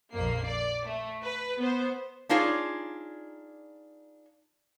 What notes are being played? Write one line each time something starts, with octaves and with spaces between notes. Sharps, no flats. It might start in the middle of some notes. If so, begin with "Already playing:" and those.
A#1 F2 A#3 C7
D5
A3
B4
B3 C5
D4 D#4 F4 G#4 C#5 D5